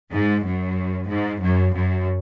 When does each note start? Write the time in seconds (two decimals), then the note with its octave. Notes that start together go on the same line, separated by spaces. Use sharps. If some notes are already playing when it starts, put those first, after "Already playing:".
0.12 G#2
0.44 F#2
1.09 G#2
1.41 F#2
1.74 F#2